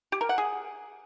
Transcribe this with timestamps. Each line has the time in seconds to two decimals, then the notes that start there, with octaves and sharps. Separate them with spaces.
0.12 G4
0.21 A#4
0.29 F#5
0.38 G#4